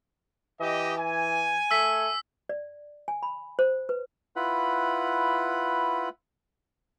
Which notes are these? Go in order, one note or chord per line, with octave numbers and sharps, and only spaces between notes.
E3 G4 D#5
G#5
A3 E6 B6
D5
G#5
B5
C5
B4
E4 F4 B4 F#5 B5